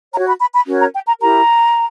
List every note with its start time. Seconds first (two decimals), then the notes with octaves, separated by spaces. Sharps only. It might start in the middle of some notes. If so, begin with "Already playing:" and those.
0.13 C#5 A#5
0.18 F#4
0.27 B5
0.41 B5
0.54 B5
0.67 C#4 F#4 A#4 C#5
0.80 A#5
0.94 G5
1.08 A#5
1.22 E4 G4 A#4 A#5